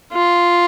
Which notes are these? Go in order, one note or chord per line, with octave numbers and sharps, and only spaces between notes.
F4